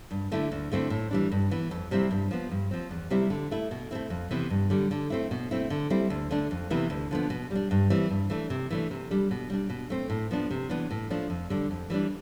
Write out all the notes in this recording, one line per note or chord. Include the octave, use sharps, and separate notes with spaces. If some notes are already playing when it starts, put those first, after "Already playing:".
G2
D3 A3 E4
D2
D3 A3 C4 E4
A2
E3 G3 D4
G2
E3 B3
F2
C3 G3 C4 E4
G2
F3 B3
G2
F3 C4
E2
C3 G3 C4 E4
D3
A3 E4
B2
A3 C4 E4
F2
C3 E3 B3
G2
D3 G3
D3
A3 C4 E4
B2
A3 C4 E4
D3
G3 C4 E4
D2
D3 A3 D4
F2
C3 E3 B3 E4
D2
D3 F3 B3
B2
G3 D4
G2
E3 G3 C4 E4
G2
E3 A3 D4
C3
E3 A3 D4
C3
G3 D4
B2
G3 D4
B2
A3 C4
A2
F3 B3 D4
C3
E3 B3 D4
A2
F3 A3 D4
F2
D3 G3 D4
F2
E3 G3 D4